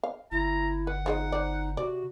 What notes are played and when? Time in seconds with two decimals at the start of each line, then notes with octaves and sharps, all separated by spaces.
0.03 F5
0.32 G1 E4 A#5
0.87 B4 F#5
1.06 F3 D#4 G#4 D#5
1.32 C5 D5
1.77 C3 F#4 D5